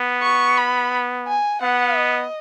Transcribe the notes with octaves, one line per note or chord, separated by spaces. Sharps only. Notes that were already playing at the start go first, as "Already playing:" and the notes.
Already playing: B3
C#6
B5
G#5
B3 F#5
D#5